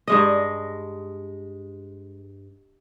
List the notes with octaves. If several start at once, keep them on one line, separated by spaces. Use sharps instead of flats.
G2 G#3 D#5